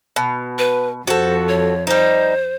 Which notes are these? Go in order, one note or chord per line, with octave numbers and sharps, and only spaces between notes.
B2
B4
F2 F#4 A4 C5
C#5
G3 D#4 C5